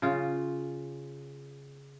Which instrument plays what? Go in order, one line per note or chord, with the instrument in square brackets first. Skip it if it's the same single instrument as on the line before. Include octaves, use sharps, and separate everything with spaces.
[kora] C#3 F4